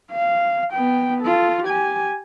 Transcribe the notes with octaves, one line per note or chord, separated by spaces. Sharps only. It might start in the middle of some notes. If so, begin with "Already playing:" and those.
F5
B3 G5
F4 A4
G4 G#5